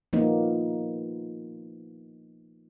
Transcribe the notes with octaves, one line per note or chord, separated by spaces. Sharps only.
F3 A#3 B3 D#4